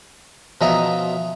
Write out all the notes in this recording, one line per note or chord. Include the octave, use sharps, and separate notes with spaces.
B2 F3 C#4 D#5 E5 A#5